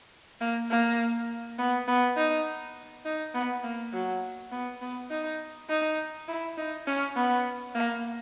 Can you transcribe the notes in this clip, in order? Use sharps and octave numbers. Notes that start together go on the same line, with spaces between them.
A#3
A#3
B3
B3
D#4
D#4
B3
A#3
F#3
B3
B3
D#4
D#4
E4
D#4
C#4
B3
A#3